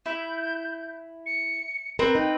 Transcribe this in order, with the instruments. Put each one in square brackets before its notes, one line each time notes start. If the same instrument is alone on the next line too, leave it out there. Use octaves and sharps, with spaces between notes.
[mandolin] E4 [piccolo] G6
[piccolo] C#7
[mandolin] C4 B4 [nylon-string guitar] A#4
[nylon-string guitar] D#4 [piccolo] G5